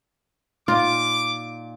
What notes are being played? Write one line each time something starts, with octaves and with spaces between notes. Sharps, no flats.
A#2 D#4 F4 D6